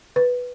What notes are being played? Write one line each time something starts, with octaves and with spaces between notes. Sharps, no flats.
B4